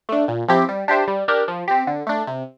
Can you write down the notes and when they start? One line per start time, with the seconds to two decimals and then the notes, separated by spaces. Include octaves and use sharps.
0.09 A3 D4
0.28 A#2
0.48 F3 C4 E4 G4
0.69 G3
0.88 D4 G4 C5 E5
1.08 G3
1.28 D4 G4 A#4
1.48 F3
1.68 C4 G4
1.87 D3
2.07 A3 D4
2.27 C3